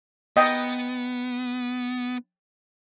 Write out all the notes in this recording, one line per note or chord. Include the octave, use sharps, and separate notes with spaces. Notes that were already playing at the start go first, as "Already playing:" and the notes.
B3 D#5 G5